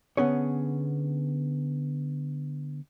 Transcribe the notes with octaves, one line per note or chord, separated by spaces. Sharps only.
D3 B3 C#4 G#4 C#5